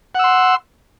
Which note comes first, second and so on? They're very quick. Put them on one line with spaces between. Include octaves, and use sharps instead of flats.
F#5 E6 C6